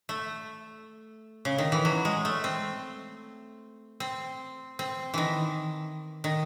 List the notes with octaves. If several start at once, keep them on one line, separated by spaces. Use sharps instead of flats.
A3
C#3
D#3
E3
F#3
G#3
A3
C4
C4
C4
D#3 E3
D#3